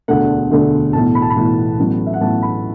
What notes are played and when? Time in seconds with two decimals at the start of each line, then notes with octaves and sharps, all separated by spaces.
0.08 E1 D2 D3 A3 F#5
0.50 E1 D2 D3 A3
0.93 B1 A2 E3 B3 A5
1.15 B5
1.22 A5
1.30 B5
1.36 B1 A2 E3 B3
1.79 A1 A2 F#3 B3
2.06 E5
2.13 F#5
2.21 A1 A2 F#3 B3 A5
2.42 B5